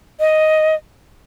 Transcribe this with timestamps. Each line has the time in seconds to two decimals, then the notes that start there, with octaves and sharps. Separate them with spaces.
0.20 D#5